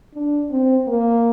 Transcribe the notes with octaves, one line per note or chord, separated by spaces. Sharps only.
D4
C4
A#3